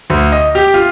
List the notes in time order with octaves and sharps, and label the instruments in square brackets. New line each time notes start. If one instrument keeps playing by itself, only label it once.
[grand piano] D2
D#5
G4
F4